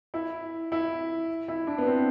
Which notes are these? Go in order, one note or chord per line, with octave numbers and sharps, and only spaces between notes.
E4
E4
E4
D4
B3
C4